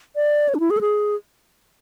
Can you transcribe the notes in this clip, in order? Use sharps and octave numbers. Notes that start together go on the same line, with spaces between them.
D5
C#5
D4
E4
G#4
A4
G#4